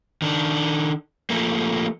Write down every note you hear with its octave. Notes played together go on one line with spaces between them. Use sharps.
D#3 D4
F3 A3 A#3